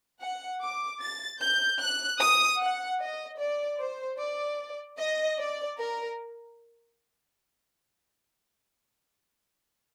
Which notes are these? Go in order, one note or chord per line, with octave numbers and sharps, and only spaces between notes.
F#5
D6
A6
G6
F#6
D#6
F#5
D#5
D5
C5
D5
D#5
D5
A#4